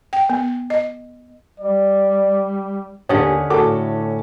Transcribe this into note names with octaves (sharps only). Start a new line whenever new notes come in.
G5
B3
D#5
G3 D5
D#2 D3 C#4 G4 G#4 F#5
A2 F#4 A4 D6